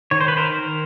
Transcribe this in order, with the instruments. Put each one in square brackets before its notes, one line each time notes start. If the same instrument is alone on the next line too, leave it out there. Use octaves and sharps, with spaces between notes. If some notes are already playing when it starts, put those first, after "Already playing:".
[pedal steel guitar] D#3 C#5
C5
B4
A#4 C5
D#3